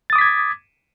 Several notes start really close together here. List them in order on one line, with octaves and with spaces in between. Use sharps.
A6 D#6 D6 B6 G#6